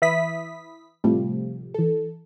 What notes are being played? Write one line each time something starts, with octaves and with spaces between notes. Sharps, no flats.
E3 E5 B5 D#6 B6
A2 C3 F3 G3 A3
E3 A4